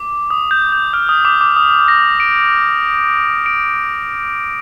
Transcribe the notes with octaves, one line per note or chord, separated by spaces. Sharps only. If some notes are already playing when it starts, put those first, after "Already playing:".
Already playing: D6
D#6
G6
G6
F6
D#6
D6
D6
D#6
A#6
D7
D7